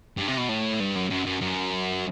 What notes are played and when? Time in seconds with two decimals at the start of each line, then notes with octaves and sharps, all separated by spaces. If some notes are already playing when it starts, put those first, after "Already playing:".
0.17 G2
0.28 C3
0.38 B2
0.49 A2
0.80 G2
0.95 F#2
1.10 F#2
1.26 F#2
1.41 F#2